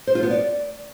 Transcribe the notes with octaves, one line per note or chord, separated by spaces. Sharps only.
C5
F4
B3
D5